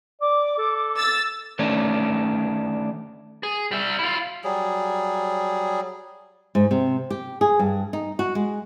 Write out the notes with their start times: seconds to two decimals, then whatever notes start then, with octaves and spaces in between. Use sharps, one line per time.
0.21 D5 D6
0.58 A4
0.97 E6 A6
1.59 D#3 A3 C#4 D4
3.43 G#4
3.71 G3 E5
3.99 E4 F4
4.44 F#3 G3 G#4
6.55 G#2
6.71 C3
7.10 G4
7.41 G#4
7.59 G2
7.93 D#4
8.19 F#4
8.35 G#3